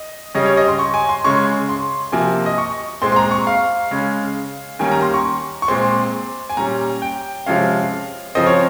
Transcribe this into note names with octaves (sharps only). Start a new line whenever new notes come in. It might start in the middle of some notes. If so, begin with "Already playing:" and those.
Already playing: D#5
C#3 G3 C#4 D#5
C#5
D#5
C6
C#6
G#5
C6
C#3 G#3 C#4 C#6
C6
C3 F3 A#3 G#5
D#5
C#6
A#2 G#3 C4 C6
C6
A#5
C#6
F5
C#3 G#3 C#4
D#3 G3 A#3 C#4 G#5
A#5
C6
C#6
C#6
A#2 G#3 C4 C6
G#5
A#2 G3 C#4 A#5
G5
C3 F3 G#3 C#4 F5
C#3 F3 C4 D#5
C#5